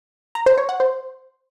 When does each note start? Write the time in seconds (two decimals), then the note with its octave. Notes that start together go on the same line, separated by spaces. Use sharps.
0.35 A#5
0.46 C5
0.58 C#5
0.69 F#5
0.80 C5